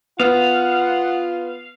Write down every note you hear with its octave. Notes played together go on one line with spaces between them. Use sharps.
B3 F4 F5 F#5